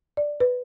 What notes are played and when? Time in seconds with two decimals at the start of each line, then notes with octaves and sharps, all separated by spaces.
0.17 D5
0.40 B4